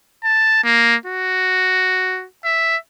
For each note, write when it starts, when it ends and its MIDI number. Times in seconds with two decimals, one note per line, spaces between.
0.24 0.61 81
0.64 0.96 58
1.06 2.26 66
2.45 2.77 76